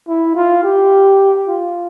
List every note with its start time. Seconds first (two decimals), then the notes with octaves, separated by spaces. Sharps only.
0.08 E4
0.35 F4
0.64 G4
1.48 F4